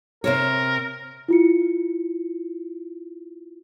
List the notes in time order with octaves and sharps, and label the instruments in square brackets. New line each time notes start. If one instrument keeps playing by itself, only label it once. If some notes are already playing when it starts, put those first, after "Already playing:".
[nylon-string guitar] C3 C5 C#5 [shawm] A#4
[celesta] E4 F4 C#7